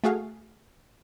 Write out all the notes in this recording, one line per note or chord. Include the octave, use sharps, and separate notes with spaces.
A3 F#4 G#4 F5